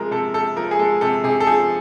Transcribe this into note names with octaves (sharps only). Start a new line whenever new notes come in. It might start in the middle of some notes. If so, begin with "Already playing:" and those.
Already playing: C3 F3 G#3 A#4
C3 A4
C3 A4
F3 A#4
G#4
G#3 A4
C3 A4
C3 G#4
A4
F3 G#4